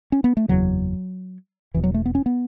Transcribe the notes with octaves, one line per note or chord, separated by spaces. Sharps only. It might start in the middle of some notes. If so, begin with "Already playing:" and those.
C#4
B3
A3
F#1 E2 C#3 F#3
E1 E2 B2 E3
F#3
A3
B3
C#4
B3